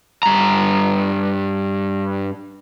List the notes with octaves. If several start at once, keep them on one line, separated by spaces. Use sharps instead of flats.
G2 A#5